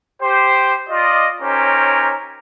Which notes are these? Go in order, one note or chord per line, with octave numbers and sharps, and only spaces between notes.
G4 C5
F4 D5 D#5
C#4 D#4 G4 A#4 C5 C#5